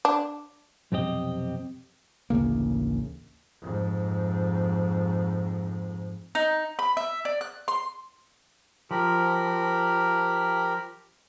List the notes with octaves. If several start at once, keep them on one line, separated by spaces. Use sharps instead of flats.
D4
B1 F2 C3 C4 G4 D#5
A1 D2 C#3 A#3
F2 G#2
D#4
B5
E5
D5
F#6
C6
F3 G4 A#4 B5